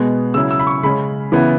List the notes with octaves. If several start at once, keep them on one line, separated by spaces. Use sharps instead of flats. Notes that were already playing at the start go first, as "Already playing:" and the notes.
Already playing: B2 G#3 B3
C#3 F#3 E4 E6
E6
B5
C#6
C#3 G#3 C#4 B5
C#3 E3 B3 E4